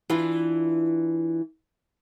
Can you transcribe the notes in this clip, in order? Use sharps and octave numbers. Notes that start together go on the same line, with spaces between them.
E3 D4 E4 F4